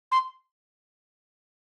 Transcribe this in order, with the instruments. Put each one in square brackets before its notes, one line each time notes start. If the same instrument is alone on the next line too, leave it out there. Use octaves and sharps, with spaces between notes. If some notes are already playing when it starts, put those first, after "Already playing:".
[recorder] C6